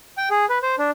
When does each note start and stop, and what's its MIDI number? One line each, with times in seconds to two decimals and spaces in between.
0.17 0.29 79
0.31 0.46 68
0.49 0.59 71
0.63 0.75 72
0.78 0.91 62